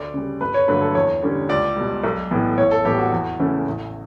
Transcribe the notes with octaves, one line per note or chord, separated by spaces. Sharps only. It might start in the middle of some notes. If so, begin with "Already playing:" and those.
Already playing: D2 D5
C#3 G3
G1 B4
C#5
G2 D3 F#3 A3 B4
A4
E2 C#5
D3 G3 C#4
C#2 D5
B2 G3
B1
A2 E3 B3
A1 C#5
A4
A2 E3 G3 B3 G4
F#4
E2
C#3 E3 A3 C#4
A1